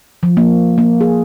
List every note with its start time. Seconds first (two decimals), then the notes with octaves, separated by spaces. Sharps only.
0.23 F3
0.37 A#3
0.78 A#3
1.01 G#4